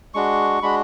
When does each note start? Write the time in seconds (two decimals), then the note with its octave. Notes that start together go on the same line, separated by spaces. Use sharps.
0.14 G#3 D4 F#4 C#6
0.62 G#3 D4 F#4 B5